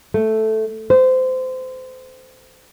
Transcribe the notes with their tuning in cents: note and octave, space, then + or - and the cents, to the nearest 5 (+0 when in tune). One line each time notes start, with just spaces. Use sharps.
A3 -5
C5 -25